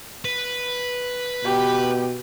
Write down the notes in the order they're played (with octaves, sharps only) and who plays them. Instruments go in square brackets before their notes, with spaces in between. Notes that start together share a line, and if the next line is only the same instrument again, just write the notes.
[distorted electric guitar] B4
[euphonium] B2 [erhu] G4